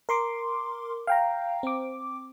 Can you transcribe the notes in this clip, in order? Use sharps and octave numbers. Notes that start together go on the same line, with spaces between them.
A#4 C6 D6
F5 G5 A#5
C4 D6